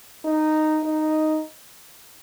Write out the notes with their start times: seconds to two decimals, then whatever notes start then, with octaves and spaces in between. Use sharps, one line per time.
0.25 D#4
0.84 D#4